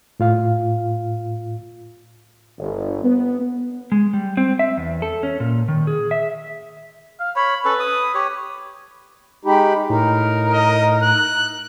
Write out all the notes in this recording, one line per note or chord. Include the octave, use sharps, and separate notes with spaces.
A2 F4 F5
G1
B3
G#3
G3
C4
E5
E2
A4
C#4
A#2
D#3
G#4
E5
F5
C#5 B5
C#4 A4 B4
D#6
G4 C#5
G#3 D#4 G4 G5 B5
A2 D#4 A#4
D#5
F#6